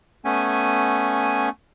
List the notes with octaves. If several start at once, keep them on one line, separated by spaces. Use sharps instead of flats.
A3 B3 C#4 G#5